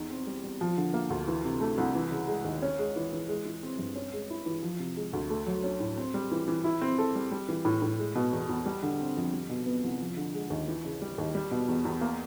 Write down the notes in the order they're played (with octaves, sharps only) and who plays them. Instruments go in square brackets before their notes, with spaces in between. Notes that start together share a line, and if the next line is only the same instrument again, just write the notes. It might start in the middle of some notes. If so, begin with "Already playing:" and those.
Already playing: [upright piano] E2 D#4
C4
G3
G3
F3
D3
A#3
D2
E3
C3
A3
C2
E3
C#3
G#3
D#2
C#4
G#3
E3
E3
G#3
E3
C4
G2
C#4
G#3
E4
E3
F3
C3
G#3
D2
A3
F#3
C#4
A2
C4
G3
E3
E3
E4
C4
A4
G3
G3
E3
A2
A2
G#3
B2
E2
E2
G3
D3
C4
F2
G3
B2
B3
C2
F3
D3
G#3
D#2
E3
C#3
G3
D#2
G3
B2
E2
E2
A#3